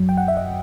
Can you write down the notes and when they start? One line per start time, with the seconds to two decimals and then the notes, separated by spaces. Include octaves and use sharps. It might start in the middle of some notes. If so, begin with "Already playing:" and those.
Already playing: F#2 F#3
0.09 G5
0.17 F#5
0.28 E5
0.37 D#5